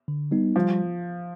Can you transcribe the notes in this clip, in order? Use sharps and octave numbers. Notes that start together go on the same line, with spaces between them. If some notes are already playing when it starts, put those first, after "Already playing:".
D3
G3 B3 D#4
F3 G3